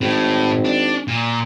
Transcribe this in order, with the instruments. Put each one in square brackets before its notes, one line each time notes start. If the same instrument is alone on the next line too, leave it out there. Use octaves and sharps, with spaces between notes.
[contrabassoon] G#1 [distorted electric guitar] A2
[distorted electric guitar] D4
A#2